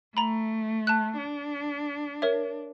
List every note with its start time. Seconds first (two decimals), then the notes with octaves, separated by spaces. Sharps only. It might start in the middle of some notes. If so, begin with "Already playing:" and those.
0.17 A3 A#5 B5
0.87 A5 F#6
1.18 D4
2.22 A#4 C#5 E5